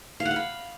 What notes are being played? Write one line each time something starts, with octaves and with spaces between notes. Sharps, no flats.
F5
F#5
F5
B5